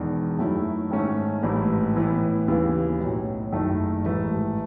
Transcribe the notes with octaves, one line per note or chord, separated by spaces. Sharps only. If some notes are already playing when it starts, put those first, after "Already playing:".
Already playing: E1 E2 D#3
F#2 D#3 F#3 A3 E4
G#2 D#3 A3 C#4
A1 G#2 E3 A3 E4
A2 E3 B3
D#2 C#3 E3 B3
B1 A2 F#3
F#1 F#2 D#3 A3 E4
A1 G#2 E3 A3